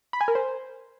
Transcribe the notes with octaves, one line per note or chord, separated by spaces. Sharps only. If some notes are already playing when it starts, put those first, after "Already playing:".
B5
G#5
A#4
C5